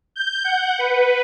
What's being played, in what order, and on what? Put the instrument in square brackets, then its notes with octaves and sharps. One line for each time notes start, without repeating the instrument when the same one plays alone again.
[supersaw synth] G6
F#5
B4